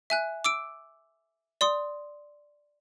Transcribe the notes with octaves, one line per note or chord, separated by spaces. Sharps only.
E5 G#5 F#6
D6 E6 D7
D5 C6 D#6